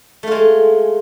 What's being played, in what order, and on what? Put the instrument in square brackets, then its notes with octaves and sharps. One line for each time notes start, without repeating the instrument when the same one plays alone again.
[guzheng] A3
F4
G#3